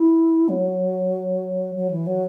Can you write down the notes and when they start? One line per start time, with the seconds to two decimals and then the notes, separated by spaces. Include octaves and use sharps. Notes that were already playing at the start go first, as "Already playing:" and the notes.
Already playing: E4
0.49 F#3
1.75 F#3
1.91 E3
2.06 F#3